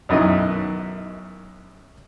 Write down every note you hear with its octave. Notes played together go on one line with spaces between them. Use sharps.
B1 F#2 D#3 E4 D#5